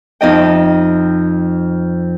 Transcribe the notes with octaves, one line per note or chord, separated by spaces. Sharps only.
F2 D#4 D#5 G5